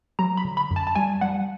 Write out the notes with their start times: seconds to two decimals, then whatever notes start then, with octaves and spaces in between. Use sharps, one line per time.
0.19 F#3 A#5
0.37 B5
0.45 D3
0.57 B5
0.71 F#2
0.76 A5
0.87 A5
0.95 G3 G#5
1.21 G3 F#5